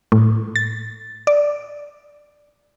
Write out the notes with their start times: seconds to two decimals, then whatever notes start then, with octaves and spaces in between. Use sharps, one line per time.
0.12 A2
0.56 A6
1.27 D5